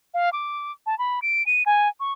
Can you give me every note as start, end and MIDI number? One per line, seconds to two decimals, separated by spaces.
0.14 0.30 77
0.33 0.72 86
0.87 0.97 81
0.99 1.20 83
1.22 1.45 98
1.46 1.63 99
1.66 1.88 80
2.00 2.13 85